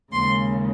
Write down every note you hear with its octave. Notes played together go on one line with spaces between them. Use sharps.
D#2 C#3 G#3 C6